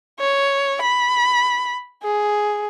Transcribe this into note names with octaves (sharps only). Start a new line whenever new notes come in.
C#5
B5
G#4